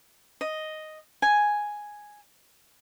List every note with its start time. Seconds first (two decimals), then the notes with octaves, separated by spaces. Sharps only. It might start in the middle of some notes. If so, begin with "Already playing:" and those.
0.41 D#5
1.22 G#5